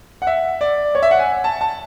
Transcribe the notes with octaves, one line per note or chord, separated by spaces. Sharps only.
F#5
E5
D5
C#5
E5
F#5
G#5
A5
A5